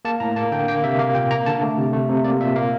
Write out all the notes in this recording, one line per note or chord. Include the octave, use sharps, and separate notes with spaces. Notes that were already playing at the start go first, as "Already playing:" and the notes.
A#3 A5
A2 A#5
A#3 A5
D3 G5
A#3 G5
C3 E5
A#3 F5
A#2 G5
A#3 A#5
D3 A5
A3
C3
A3
C3
A#3 D5
A#2 E5
A#3 F5